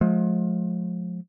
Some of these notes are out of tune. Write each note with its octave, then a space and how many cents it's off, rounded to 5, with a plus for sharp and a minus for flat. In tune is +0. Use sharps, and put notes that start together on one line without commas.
F3 +30 G#3 +40